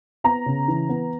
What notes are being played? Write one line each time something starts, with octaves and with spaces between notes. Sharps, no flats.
B3 A#5
C#3
E3
B3